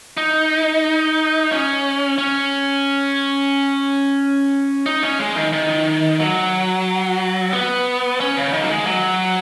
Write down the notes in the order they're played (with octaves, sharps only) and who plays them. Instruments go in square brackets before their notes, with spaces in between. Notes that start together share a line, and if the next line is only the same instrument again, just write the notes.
[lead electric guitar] D#4
C#4
C#4
D#4
C#4
G#3
D#3
D#3
F#3
B3
C#4
C#3
D#3
F#3
G#3
F#3